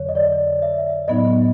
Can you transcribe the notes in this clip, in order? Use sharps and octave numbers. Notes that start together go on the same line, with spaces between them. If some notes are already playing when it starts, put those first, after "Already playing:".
Already playing: F2 D3 F#3 C#5
D#5
D5
E5
A2 F#3 B3 D#4 D#5